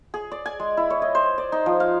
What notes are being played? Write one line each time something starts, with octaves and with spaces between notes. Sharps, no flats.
G#4
D5
G#5
G#3
E4
C#5
D#5
C5
D5
D#4
F3
F5